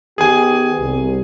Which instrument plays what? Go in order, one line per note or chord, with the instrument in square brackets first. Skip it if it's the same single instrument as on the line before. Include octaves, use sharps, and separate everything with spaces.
[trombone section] D#3 B3 G4 [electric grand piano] G#4 G#5
[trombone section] C2